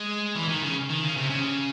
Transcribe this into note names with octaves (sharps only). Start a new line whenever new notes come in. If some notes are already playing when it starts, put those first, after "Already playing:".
Already playing: G#3
E3
D#3
C#3
D#3
C#3
C3
C#3